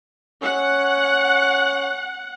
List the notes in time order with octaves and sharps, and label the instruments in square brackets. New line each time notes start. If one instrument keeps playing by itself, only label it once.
[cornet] C#4 [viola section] F#5